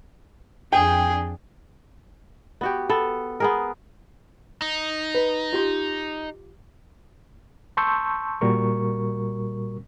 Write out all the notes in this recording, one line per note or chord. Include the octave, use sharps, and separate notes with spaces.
F2 D4 G#4 G5
B3 F#4 G4
B3 A4
B3 G#4 A#4
D#4
B4
F4 G4 C6
A5 C6 C#6 E6 G6
A#2 G3 F#4 A#4 C#6